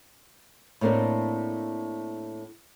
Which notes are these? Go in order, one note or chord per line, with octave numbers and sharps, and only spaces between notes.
A2 A3 A#3 C4 D4